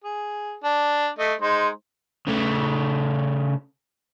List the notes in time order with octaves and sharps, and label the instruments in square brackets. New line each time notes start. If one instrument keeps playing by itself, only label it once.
[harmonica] G#4
D4
A3 D#5
G#3 D#4 C5
[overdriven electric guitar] C#3 A3